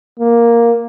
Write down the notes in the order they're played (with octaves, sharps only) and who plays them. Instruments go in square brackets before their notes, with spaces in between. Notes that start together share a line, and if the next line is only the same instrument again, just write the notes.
[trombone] A#3